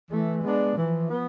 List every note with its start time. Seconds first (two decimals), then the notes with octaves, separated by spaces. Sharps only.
0.11 E3 A3
0.43 G#3 B3 D4
0.77 E3 F3
1.10 B3